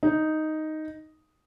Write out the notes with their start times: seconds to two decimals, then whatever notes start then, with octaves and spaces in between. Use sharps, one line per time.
0.03 D#4